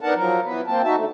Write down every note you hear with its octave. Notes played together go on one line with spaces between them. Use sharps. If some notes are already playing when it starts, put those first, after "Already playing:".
B3 D4 D#4 A#4 F#5 A5
F3 F#3 A#4
E3 B3 B4
A#3 C4 A5
D#4 F#4 E5 A5
D3 A3